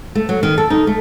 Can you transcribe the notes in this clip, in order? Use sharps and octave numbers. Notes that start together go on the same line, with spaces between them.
A3
F#3
D#3
A4
D#4
A3